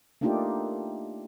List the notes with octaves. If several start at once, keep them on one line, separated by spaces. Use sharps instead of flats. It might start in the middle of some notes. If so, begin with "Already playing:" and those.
A3 A#3 D4 D#4 F4 G4